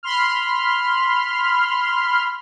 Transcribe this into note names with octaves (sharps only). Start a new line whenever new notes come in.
B5 C6 F6